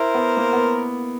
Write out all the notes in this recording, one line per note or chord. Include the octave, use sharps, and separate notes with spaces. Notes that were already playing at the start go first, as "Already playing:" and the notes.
Already playing: E4 A#4 C5
B3
A#3
B3